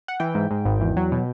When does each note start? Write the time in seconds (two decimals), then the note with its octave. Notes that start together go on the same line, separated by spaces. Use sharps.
0.08 F#5
0.20 E3 G5
0.35 G#2
0.51 G#2
0.65 G#1
0.81 E2
0.97 F#3
1.12 B2